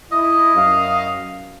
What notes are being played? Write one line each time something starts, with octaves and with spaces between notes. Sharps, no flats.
E4 D#5
F#2 F5